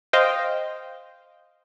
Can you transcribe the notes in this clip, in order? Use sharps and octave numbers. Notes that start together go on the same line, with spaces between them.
C5 D#5 F5 G5